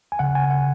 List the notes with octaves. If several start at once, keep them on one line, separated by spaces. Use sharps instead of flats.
G#5
C#3 F#5
G#5
F#5